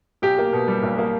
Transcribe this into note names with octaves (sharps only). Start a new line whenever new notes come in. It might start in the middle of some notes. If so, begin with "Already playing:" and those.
B1 G4
A#3
B2
G3
B1
A#3